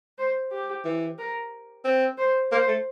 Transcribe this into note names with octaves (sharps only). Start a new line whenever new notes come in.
C5
G4
E3
A#4
C4
C5
A#3 C5
A3